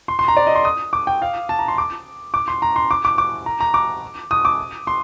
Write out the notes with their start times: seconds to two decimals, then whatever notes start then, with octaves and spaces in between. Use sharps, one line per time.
0.08 C6
0.19 C6
0.28 A#5
0.37 D5
0.47 D#5
0.55 C6
0.65 D#6
0.93 D6
1.07 G5
1.22 F5
1.49 A5
1.59 A#5
1.68 C6
1.78 D6
2.34 D6
2.48 C6
2.62 A#5
2.76 C6
2.91 D6
3.05 D6
3.18 D6
3.46 A#5
3.60 A#5
3.74 D6
4.31 D#6
4.45 D6
4.87 C6